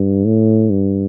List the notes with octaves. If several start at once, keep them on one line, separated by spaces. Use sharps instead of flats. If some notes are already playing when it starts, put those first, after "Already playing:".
Already playing: G2
A2
G2